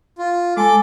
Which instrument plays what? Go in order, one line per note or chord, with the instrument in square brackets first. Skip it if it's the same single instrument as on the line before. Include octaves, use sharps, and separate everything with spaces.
[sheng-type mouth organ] F4
[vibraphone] G#3 G#5 [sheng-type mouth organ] A4 D6